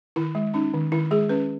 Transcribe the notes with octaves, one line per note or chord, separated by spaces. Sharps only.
D#3 E4
G#3
C#4 D#4
D#3
D#3 E4
G#3 G#4
C#4 B4